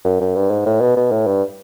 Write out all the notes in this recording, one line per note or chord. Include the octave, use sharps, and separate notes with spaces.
F#2
F#2
G2
G#2
A2
B2
B2
A2
G2